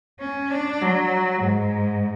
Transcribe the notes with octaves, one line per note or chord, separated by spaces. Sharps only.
C#4
D4
F#3
G#2